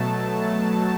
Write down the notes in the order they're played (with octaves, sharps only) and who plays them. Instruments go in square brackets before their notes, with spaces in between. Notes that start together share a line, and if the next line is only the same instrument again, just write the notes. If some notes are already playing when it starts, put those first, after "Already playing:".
Already playing: [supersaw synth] B2 F#3 A3 A5